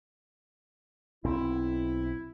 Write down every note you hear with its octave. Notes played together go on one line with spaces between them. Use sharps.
B1 C4 E4